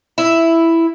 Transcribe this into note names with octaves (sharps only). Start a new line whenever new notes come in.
E4